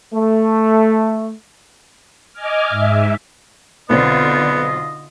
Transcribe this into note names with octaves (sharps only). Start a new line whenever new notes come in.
A3
D#5 G#5 D6 F6
G#2 E5
B1 D3 B3 C4 F4 D5 D#5